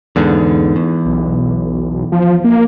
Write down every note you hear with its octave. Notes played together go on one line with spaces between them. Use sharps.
E2 G#2 D3
E2
B1
F3
A#3